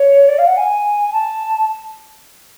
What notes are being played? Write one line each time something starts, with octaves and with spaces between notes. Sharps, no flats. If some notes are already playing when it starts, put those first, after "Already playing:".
Already playing: C#5
D5
F5
F#5
G#5
A5